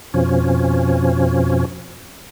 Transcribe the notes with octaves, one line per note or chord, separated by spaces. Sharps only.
F2 B2 F3 C#4